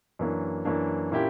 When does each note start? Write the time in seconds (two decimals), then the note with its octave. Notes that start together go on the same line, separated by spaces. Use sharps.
0.19 F#2 E3 A#3 D4
0.65 F#2 E3 A#3 D4
1.12 A#2 A#3 C#4 E4 G4